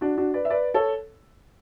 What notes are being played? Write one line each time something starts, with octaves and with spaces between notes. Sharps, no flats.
D4 F#4
D4 F#4
B4 D5
E5
B4 D5
A4 C#5